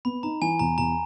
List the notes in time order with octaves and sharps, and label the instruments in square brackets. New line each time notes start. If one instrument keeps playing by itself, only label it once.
[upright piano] B3 [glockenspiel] B5
[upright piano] D#4 [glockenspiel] A#5
[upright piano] E3 [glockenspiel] G#5
[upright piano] E2 [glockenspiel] A#5
[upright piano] E2 [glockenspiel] A#5